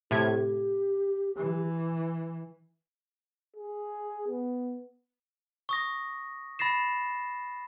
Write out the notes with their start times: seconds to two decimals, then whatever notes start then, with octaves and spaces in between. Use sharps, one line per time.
0.11 A2 C3 G4 G#6
1.37 E3
3.57 G#4
4.28 B3
5.69 C#6 D#6 A#6
6.59 B5 A6 A#6 C7 E7